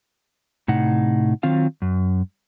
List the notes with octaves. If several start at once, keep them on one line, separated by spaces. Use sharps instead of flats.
A2 C3 D#4 F#5
D#3 F#3 C4 F4 F5
F#2